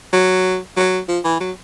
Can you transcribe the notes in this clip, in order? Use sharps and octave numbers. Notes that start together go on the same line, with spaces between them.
F#3
F#3
F3
E3
F#3